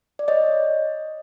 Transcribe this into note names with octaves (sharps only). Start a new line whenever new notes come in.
D5
C#5 D#5